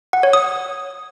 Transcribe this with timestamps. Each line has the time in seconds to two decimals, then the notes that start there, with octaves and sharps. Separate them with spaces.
0.13 F#5
0.23 C#5
0.33 D#6